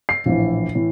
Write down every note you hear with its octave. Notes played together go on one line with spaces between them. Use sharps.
C7
A#1 A2 E3
A2 E3